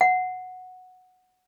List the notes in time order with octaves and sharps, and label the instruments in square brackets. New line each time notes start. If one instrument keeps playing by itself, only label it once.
[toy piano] F#5